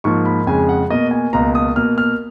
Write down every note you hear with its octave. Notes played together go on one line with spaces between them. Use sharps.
G#2 F3 A#3 C#6
B5
F2 C#3 G#3 G#5
F#5
B2 A#3 D#5
G#5
C#2 B2 A#3 A#5
D#6
B2 A#3 F6
F6